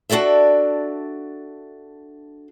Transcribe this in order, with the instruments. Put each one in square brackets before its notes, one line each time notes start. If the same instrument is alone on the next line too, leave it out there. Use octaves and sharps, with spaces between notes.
[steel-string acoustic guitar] D4 F#4 A4 D5 E5